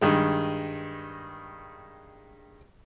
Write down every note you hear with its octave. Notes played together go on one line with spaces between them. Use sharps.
G2 D#3 G#3